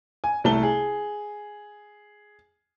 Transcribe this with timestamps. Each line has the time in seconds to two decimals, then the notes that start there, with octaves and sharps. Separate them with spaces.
0.24 G#5
0.44 C2 A3 A5 G7
0.63 G#4